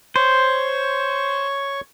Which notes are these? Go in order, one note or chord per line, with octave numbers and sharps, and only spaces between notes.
C5 C#5 C#6